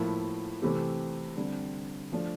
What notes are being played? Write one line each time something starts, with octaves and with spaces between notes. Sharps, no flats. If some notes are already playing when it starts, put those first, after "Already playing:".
Already playing: A2 F3 A#3 E4
C3 E3 A3 C4 G4
D3 G3 C4
F3 A3 D4